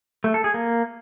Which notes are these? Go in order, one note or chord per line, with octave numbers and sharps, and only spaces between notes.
A3
A4
G#4
A#3